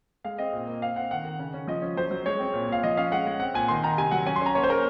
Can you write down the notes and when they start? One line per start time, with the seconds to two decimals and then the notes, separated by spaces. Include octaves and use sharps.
0.24 G#3 F5
0.38 C4 D#5
0.53 A#2
0.67 A#3
0.82 C4 F5
0.96 C4 F#5
1.11 D#3 F#5
1.25 D#3
1.39 C#3
1.54 C#4
1.68 F3 D#5
1.82 C#4
1.97 F#3 C5
2.11 F#3
2.26 G#3 C#5
2.39 C4
2.54 A#2
2.68 A#2 F5
2.83 F3 D#5
2.97 C#4 F5
3.12 G#3 F#5
3.26 G#3
3.40 C4 F#5
3.54 A#2 G#5
3.68 D#3 C6
3.83 D#3 A#5
3.98 C3 G#5
4.11 F#3 F#5
4.27 C#4 G#5
4.36 C6
4.41 C#4 A#5
4.55 A#3 C#5
4.63 C5
4.69 A#3 A#4